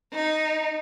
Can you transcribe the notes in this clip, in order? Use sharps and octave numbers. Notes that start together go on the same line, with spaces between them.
D#4